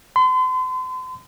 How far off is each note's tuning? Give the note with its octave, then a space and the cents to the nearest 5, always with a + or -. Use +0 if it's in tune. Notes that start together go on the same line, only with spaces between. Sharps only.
C6 -40